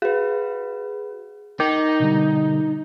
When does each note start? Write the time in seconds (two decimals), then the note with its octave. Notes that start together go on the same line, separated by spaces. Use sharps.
0.02 F#4 G#4 B4
1.60 D#4 A#4 D6 G6
2.00 B2 D3 G3